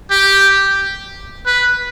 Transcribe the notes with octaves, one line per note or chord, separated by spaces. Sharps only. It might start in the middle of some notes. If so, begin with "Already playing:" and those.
G4
B4